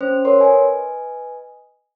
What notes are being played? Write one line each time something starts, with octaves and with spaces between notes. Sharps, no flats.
C#4 C5
A#4 C#5 C6
B4 D#5 G#5